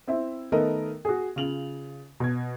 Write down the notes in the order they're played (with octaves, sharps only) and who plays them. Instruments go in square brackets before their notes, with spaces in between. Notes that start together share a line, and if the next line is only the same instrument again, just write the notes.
[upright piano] C4 E4 E5
D#3 A3 B3 A4 A#4 D#5
F#4 G#4
C#3 F4 F7 F#7
B2 G#6